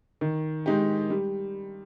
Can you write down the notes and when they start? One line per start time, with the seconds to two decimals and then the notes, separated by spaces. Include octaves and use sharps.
0.21 D#3
0.66 G#3 D#4 G4
1.10 G3